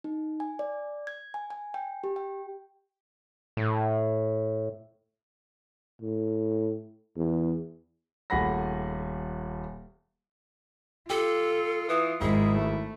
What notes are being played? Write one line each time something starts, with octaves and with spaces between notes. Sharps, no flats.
D#4
G#5
D5
G#6
G#5
G#5
G5
G4
G5
A2
A2
E2
D#1 A3 G#4 F#5 B5 A#6
F4 G4 A4
E3 D#6
G#1 G#2 E4 G#4
A3